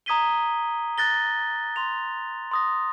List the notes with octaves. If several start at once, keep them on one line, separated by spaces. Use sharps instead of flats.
A#5 D#6 G#6 B6 D#7 G7
F#6 A6 A#6 G7
C6 F7
C6 D#6 A#6